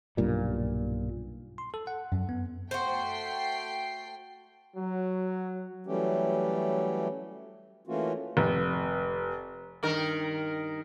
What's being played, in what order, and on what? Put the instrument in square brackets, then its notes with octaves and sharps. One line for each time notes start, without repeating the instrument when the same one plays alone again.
[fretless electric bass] B1 G2 A#2 G3
[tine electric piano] C6
A4
F#5
F#2
B3
[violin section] A3 G5 C7 [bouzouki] F#4 C5
[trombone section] F#3
[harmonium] E3 F#3 G3 A3 C#4 G4
E3 A3 A#3 C#4 F4 F#4
[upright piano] F1
[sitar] G2 D#3 A#4